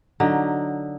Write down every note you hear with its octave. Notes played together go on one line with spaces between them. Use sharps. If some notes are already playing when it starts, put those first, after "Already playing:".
D3 F#3 D#4